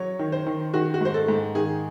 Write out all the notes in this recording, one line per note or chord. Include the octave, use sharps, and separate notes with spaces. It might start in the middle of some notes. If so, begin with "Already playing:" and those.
Already playing: F#3 C#5
D#3
C5
D#3
D#3 F#4
F#4
G#2 C5
A4
G#2
D#3 G#4